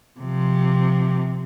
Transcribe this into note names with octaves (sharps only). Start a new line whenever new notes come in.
C3 F3